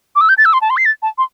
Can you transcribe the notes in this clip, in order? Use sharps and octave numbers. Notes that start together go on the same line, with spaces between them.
D6
E6
G6
A6
E6
C6
A5
C6
C7
A6
A5
C6